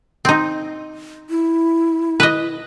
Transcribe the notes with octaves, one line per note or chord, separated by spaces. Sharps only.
C4 D#4
E4
B4 D#5